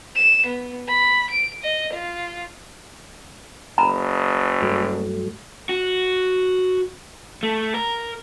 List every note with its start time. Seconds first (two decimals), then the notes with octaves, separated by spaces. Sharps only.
0.16 E7
0.46 B3
0.88 B5
1.30 D7
1.63 D#5
1.93 F4
3.78 F#1 A#5 B5
4.62 G2 F#3 A3
5.69 F#4
7.43 A3
7.74 A#4